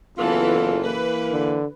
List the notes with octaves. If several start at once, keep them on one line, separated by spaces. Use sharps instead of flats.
F#1 E3 B3 F4 A4
E3 A#3 B4
D3